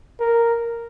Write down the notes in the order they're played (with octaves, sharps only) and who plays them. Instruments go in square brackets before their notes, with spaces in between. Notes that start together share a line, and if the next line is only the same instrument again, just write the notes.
[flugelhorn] A#4